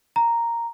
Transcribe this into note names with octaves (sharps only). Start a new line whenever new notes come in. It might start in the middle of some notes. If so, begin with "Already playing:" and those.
A#5